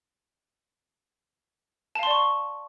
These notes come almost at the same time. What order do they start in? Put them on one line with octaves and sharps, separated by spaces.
A5 F5 C6 D5 C#6